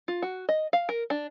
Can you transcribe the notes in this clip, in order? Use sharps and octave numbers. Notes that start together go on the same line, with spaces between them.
F4
F#4
D#5
F5
A#4
D4